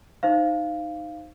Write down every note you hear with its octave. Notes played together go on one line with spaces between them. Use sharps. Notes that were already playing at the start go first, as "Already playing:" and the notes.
D#4 C5 F5